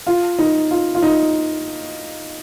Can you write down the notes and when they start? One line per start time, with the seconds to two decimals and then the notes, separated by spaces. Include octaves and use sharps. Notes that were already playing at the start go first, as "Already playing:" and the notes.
0.07 F4
0.39 D#4
0.71 F4
0.95 F4
1.03 D#4